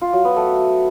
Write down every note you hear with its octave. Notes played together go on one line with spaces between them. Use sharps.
F4
F#3
B3
A3